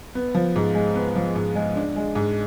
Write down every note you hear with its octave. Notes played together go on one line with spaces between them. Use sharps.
B3
F3
G#2
G#3
B3
F3
G#2
G#3
D4
G#3
G#2